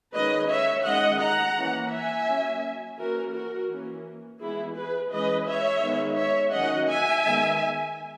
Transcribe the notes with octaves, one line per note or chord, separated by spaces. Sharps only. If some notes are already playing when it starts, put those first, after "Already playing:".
D#3 G#3 C#4 B4 D#5
C#5 E5
D#3 G#3 C#4 D#5 F#5
F#5 A#5
E3 A#3 C#4
E5 G#5
F#3 A#3 C#4
E3 A#3 C#4 F#4 A#4
F#4 A#4
E3 A#3 C#4
E3 G#3 B3 E4 G#4
G#4 B4
E3 G#3 C#4 B4 D#5
C#5 E5
D#3 G#3 B3
C#5 E5
D#3 F#3 C#4 D#5 F#5
E5 G#5
D#3 G#3 B3